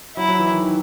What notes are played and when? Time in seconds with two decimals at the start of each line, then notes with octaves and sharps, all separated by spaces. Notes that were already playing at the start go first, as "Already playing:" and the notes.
0.17 F#3 E4
0.28 F#3
0.39 E3
0.50 D#3
0.62 D#3